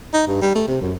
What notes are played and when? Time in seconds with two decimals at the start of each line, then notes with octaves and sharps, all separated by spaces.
0.14 D#4
0.27 G2
0.42 G3
0.55 A3
0.68 C3
0.81 F#2